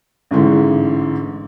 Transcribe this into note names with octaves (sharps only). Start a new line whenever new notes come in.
A1 G#2 D3 E3